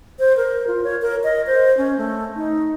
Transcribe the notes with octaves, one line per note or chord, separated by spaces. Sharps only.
C5
A#4
F4
C#5
A#4
D#5
C5
C#4
A3
D#4